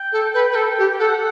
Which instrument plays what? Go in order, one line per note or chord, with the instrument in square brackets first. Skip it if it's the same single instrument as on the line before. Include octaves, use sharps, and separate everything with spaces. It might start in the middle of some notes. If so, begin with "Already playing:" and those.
Already playing: [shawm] G5
[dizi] A4
B4
B4
A4
G4
[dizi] A4 [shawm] F#5